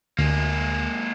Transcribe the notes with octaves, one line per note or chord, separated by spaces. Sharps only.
D2 G#3 A#3